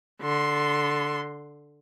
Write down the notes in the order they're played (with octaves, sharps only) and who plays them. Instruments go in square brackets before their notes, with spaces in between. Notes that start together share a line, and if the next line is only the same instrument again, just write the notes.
[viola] D3 C6